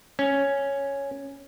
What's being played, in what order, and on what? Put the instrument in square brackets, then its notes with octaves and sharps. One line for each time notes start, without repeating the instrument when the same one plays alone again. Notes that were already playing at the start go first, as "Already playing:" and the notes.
[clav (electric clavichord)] C#4